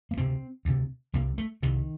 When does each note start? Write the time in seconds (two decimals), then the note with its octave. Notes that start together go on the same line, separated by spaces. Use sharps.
0.11 A#3
0.17 D2 C3 C4
0.65 D2 C3
1.13 C2 C3 A#3
1.38 A3
1.63 C2 C3 D#3